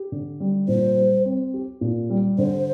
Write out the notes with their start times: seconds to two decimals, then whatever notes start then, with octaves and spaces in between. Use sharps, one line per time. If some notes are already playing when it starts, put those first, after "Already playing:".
Already playing: G4
0.12 D3
0.40 G3
0.68 A#2 C5
0.97 G3
1.25 C4
1.54 G4
1.81 A#2
2.10 G3
2.38 D3 C5